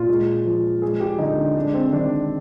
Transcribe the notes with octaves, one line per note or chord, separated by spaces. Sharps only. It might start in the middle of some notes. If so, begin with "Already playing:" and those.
Already playing: A#2 F4
G#3
F3
G#3 G#4
G4
D3 D#4
D4
G#3 D4
C4
D#3 D4